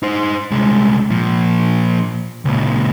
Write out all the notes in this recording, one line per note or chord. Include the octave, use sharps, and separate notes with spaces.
D#4 C5
C2 G#3
A#2 F3
C#2 A#2